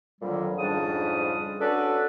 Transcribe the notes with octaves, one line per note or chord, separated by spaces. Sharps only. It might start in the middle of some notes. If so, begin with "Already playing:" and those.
F2 A#2 D3 D#3 F#3 G3
F2 G#2 C#3 G3 D4 D#6
C#4 D4 F#4 A4 B4 D5